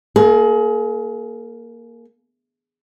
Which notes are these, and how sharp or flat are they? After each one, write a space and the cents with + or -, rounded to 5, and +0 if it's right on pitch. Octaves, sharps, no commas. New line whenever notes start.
A#3 +0 G#4 +35